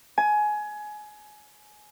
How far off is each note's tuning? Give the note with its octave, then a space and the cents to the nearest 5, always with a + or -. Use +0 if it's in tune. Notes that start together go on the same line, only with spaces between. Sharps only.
G#5 +20